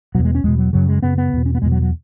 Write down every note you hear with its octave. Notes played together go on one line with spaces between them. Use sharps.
E2 B2 F#3
G#3
C#4
E2 B2 G#3
F#3
F#2 C#3 F#3
G#3
F#2 C#3 B3
B3
E2 B2
C#4
B3
E2 B2 G#3
F#3
F#3